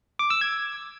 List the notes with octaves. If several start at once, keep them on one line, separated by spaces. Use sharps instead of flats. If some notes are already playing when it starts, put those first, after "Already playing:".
D6
E6
G#6